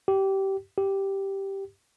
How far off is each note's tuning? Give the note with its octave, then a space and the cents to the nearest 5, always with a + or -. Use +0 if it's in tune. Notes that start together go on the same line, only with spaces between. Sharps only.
G4 -20
G4 -5